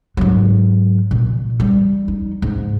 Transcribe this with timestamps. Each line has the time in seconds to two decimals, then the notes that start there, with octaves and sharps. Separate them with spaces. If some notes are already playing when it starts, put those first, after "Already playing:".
0.17 G#2 F#3
1.11 A#2
1.60 G3
2.08 D#4
2.42 G#2